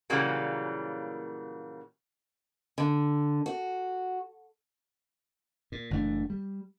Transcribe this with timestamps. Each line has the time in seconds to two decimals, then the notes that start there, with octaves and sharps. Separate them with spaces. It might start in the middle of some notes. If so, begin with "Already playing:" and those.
0.10 A#2 C#3 E3 F#3 G3 A#3
2.78 D3
3.46 F#4
5.72 A#2
5.91 F#1 E3 A3 D4
6.30 G3